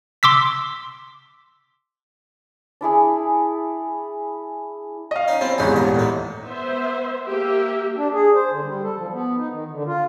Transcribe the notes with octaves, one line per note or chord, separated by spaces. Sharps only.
C6 D6 E6 B6
D4 E4 G#4 G#5
D#5 F5
C#4 D#4
C4 E4 F4
D#1 G#1 E2 C#4 D4 G#4
A#1 A#2 A#5
A2 D#4
B3 C5 E5
A#3 G4 E5
D4
G#4
C5
D3
G3
A4
F3
B3
D#4
D#3
D3
F4